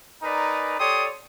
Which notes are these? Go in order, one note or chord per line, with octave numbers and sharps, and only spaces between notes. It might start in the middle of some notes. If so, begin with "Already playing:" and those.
D#4 A#4 B4 D5 G#5 A#5
G4 A4 C#5 D5 C6 D#6